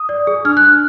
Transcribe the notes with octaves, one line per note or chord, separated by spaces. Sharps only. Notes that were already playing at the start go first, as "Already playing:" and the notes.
Already playing: D#6
D5
G#4
D4 F6
F#6
D4